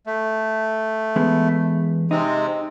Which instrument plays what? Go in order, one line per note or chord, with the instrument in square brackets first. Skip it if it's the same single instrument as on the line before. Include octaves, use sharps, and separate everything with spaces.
[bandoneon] A3
[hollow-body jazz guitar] E2 G#3 B3
[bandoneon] C3 G#3 C4 [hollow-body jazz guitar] D#4